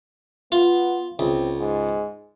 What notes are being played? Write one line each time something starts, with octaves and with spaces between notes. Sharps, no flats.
B3 F4
C#2 C4
G#2